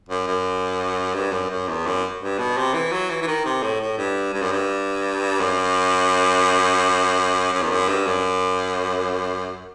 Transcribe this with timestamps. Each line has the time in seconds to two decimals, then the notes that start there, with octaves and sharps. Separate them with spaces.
0.09 F#2
0.27 F#2
1.15 G2
1.32 F#2
1.50 F#2
1.68 E2
1.86 F#2
2.21 G2
2.39 B2
2.57 C3
2.74 E3
2.92 F#3
3.10 E3
3.22 E3
3.27 D#3
3.45 C3
3.63 A2
3.81 A2
3.98 G2
4.34 G2
4.42 F#2
4.52 G2
5.40 F#2
7.52 F#2
7.62 E2
7.71 F#2
7.88 G2
8.07 F#2